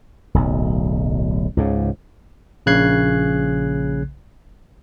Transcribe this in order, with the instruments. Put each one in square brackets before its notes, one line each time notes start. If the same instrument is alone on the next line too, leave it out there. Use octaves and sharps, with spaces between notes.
[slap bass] D1 B1
C#2 G#2 C#3
[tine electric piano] A#1 C#3 F#6 G#6 C7